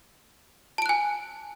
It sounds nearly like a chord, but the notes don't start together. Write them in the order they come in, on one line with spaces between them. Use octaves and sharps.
A5 D7 F#6 G#5